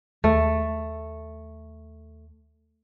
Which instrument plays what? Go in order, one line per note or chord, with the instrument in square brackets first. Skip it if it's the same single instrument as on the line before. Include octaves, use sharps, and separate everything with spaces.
[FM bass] D#2 [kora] A3